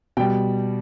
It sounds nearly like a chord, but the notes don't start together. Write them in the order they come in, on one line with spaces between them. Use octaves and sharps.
B2 G5 G3